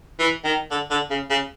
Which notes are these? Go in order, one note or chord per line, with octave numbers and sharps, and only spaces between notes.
E3
D#3
D3
D3
C#3
C#3